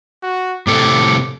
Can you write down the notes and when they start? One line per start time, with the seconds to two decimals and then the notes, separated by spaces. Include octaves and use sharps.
0.23 F#4
0.67 A2 C3 A4 D6